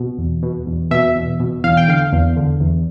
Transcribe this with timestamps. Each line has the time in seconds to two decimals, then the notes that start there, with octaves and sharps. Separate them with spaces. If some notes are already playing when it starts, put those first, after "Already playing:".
Already playing: B2
0.18 E2
0.43 B2
0.66 E2
0.91 B2 E5
1.15 E2
1.40 B2
1.64 E2 F5
1.77 G5
1.88 D3 F5
2.12 E2
2.37 D3
2.60 E2